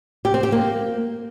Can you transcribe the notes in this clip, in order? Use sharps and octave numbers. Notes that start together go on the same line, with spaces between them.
G4
C4
G4
A#3